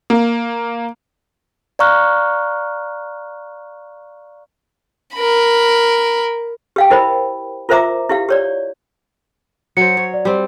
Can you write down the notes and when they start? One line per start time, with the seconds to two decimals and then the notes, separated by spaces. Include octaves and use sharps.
0.10 A#3
1.79 D5 F5 A#5 C#6 F6 F#6
5.15 A#4 B5
6.76 G4 F5 G5
6.90 E4 A#4 C5 D#5 B5
7.69 F4 A#4 C5 E5 A#5 D6
8.09 E4 G4 F5
8.29 G4 C#5 D5
9.77 F#3 C5 C#7
9.97 C#5
10.13 D5
10.25 G3 C4